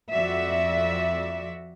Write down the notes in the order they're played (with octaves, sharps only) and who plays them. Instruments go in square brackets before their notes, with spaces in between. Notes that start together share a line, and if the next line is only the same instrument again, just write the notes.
[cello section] F2 F#4 D5 E5